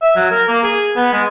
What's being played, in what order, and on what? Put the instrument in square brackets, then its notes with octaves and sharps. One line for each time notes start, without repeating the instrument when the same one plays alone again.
[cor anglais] E5
F#3
A#4
A#3
G#4
B3
G#3